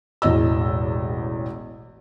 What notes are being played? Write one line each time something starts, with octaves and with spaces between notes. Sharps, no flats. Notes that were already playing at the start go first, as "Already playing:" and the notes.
E1 A1 E2 D#5 E6